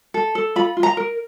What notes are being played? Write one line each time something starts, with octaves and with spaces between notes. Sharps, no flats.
A4
A4
F4 B5
F4
A#5
A#4